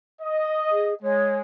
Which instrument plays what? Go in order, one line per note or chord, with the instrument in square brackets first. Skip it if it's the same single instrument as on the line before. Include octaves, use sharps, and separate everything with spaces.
[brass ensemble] D#5
[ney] G#4
[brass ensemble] G#3 [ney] C#5